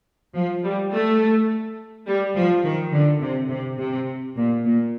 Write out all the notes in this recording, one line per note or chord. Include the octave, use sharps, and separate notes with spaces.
F3
G3
A3
G3
F3
D#3
D3
C3
C3
C3
A#2
A#2